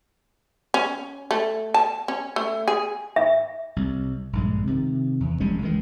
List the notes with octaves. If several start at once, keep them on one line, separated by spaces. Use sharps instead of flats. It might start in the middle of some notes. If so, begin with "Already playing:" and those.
C#4
A3
A5
C#4
A3
G#4
E5
C2
A#1 G2 G#3
C3 D#3
E2
F1 G3 G#3 C#4
C#2 D#3 E3 G#3